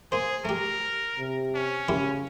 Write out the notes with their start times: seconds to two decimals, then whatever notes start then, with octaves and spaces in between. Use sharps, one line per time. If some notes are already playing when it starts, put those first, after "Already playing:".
0.12 A#3 G#4 C5
0.45 A3 G4 A#4
1.18 C3
1.55 C#4
1.88 C#3 A#3 E4 G4